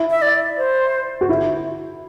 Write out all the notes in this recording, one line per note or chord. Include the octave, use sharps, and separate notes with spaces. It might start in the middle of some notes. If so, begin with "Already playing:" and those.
Already playing: E4
E5
D5
C5
F#4
E4